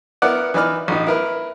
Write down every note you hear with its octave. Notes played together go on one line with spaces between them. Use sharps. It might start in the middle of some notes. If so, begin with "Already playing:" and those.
B3 E4 A#4 D5 F#5
E3 D#4 B4 D5 F6
A1 D#4
E4 A#4 B4